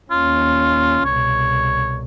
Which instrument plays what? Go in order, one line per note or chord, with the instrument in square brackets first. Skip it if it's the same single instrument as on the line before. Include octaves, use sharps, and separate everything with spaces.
[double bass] D#2 C#4 [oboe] F4
[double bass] C2 B2 [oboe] C#5